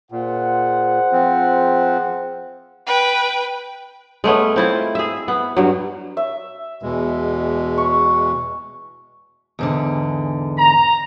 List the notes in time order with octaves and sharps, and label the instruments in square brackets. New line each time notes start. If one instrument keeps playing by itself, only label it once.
[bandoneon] A#2 [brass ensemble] G#4 C5 F#5
[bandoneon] F3 C4
[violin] B4 G5
[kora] G#3 A3 B3 C#4
C4 E4 F4
G#4 E5
B3
G2 F#3
[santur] E5
[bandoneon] E2 B2 G#3
[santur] C#6
[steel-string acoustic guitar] E2 G#2 D3
[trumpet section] A#5